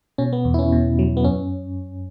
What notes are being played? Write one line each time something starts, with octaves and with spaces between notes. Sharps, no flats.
B2 C#4
B3
E2
E4
C#4
B2
F#3
B3
F#2 C#4